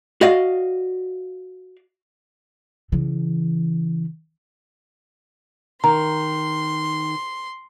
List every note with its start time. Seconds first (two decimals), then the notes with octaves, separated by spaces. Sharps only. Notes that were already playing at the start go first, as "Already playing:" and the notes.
0.21 F#4 D5 D#5 F5
2.92 C#3 E3
5.84 D#3 A#5 C6